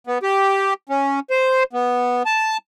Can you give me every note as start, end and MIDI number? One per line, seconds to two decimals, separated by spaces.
0.07 0.18 59
0.23 0.74 67
0.89 1.20 61
1.30 1.63 72
1.73 2.23 59
2.26 2.57 81